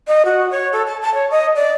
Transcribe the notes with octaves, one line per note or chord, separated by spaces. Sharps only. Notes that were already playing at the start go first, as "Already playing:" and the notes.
D#5
F#4
C#5
A4
A5
A5
C#5
D#5
D5